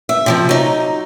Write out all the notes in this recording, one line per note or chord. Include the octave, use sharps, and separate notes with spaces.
E5
C3 F3 F#4
F#3 D#4